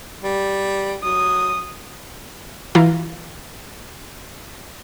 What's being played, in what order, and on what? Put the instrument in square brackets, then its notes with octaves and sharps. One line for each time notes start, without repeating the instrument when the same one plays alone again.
[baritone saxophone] G3
[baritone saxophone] F#3 [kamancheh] D#6
[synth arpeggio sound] E3 E4 F4 F5 A#5